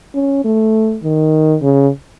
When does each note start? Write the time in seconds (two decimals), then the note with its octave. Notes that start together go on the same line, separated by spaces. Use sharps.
0.15 C#4
0.44 A3
1.04 D#3
1.62 C#3